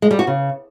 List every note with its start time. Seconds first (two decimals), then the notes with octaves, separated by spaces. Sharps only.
0.02 G#3
0.11 G3
0.19 F#4
0.27 C#3